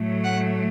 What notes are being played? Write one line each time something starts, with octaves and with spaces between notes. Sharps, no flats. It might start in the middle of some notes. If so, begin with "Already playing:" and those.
Already playing: A2 F#3 A3
F#5